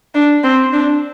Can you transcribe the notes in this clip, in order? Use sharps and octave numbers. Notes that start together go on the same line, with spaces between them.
D4
C4
D4